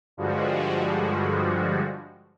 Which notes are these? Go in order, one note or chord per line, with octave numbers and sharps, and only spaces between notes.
G2 D3 F3 G3 G#3 F#4